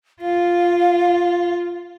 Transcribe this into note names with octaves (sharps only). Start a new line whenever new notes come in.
F4 F5